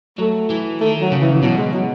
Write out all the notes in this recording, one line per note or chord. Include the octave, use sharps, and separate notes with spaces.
F#3 A3
E3
D#3 A3
F#3
C#3
E3
E3
B2 F#3
G#3
F#3